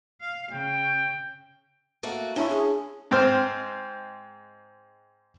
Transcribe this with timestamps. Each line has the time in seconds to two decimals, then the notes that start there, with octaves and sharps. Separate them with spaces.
0.21 F5
0.52 C#3 G5
2.03 A3 A#3 F#4
2.36 C#4 D4 E4 A5 C#6
2.50 G#4
3.11 G#2 C4 C5 F6